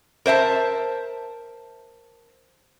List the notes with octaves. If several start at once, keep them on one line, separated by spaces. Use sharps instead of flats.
A#4 C5 E5 A5